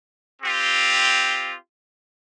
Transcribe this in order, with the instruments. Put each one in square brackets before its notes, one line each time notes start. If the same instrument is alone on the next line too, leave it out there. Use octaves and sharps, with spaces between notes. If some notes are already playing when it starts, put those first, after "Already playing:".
[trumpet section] C4 F4 G4